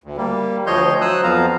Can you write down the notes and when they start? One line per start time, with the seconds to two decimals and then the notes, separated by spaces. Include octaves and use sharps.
0.04 D2
0.17 G3 A#3
0.67 D2 F3 C#5 D#5 C6 G6
1.01 F#3 C5 D#6 E6 F#6
1.23 F2 F3 B3 F5 A#5